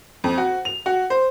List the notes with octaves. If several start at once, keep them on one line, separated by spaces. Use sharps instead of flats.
F2
F#4
F7
F#4
C5